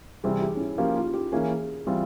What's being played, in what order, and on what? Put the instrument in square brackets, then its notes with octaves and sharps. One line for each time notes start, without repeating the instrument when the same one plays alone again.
[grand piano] C3 E3 G3 C4 [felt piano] G#4
[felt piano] G4
C#4
E4
[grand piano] F3 A#3 C#4 G4
[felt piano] F4
G4
[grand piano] E3 A#3 C#4 [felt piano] G#4
[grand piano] E3 G3 C4 F4